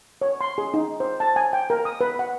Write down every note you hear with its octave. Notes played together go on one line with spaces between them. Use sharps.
C#5
C6
G#4
D#4
C5
A5
G#5
G5
A#4
D#6
B4
F#5